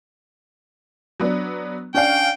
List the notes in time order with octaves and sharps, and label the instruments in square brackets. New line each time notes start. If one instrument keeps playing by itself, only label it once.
[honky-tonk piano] F#3 B3 D4
[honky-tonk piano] C#4 D4 F5 [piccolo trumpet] G5